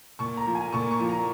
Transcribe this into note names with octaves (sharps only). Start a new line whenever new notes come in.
A#2 C#6
A#5
F3
G#5
A#2 C#6
C#6
F3
A#5